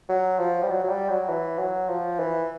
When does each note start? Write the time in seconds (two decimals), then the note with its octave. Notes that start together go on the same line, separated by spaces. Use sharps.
0.09 F#3
0.39 F3
0.63 G3
0.69 F#3
0.84 F#3
0.89 G3
1.09 F#3
1.29 E3
1.59 F#3
1.89 F3
2.19 E3